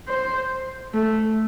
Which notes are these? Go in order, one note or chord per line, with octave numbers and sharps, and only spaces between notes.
C5
A3